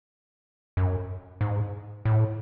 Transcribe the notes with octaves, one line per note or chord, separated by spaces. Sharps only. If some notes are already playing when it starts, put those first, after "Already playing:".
F#2
G#2
A2